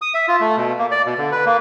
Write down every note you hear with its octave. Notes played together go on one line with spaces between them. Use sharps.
D#6
E5
F4
A3
B2
A#3
D5
B2
D3
B4
A#3